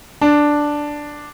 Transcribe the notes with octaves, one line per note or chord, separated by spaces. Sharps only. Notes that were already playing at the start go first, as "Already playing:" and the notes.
D4